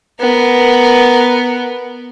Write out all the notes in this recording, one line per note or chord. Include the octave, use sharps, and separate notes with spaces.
B3 A#4